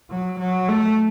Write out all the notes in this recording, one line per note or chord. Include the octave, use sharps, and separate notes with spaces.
F#3
F#3
A3